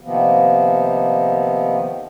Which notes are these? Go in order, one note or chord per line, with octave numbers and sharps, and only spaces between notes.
C3 D#3 F3 A#3 B3